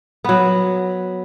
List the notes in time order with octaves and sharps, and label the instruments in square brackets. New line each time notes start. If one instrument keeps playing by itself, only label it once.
[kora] F#3 B3